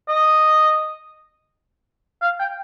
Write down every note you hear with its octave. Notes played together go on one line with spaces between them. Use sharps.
D#5
F5
G5